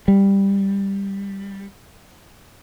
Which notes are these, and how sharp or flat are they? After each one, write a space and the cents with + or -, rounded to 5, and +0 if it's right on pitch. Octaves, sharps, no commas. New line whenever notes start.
G3 +10